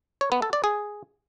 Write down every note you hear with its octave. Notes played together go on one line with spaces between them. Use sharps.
C#5
B3
A4
D5
G#4